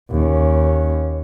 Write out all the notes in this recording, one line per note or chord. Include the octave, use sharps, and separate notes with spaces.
D#2 C#4